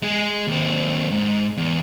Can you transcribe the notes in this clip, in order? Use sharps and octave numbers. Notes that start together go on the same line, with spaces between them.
G#3 G#4
D#2 C4
G#2
E2